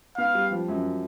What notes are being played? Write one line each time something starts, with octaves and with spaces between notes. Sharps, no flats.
B3 F5
G3
F3
F#2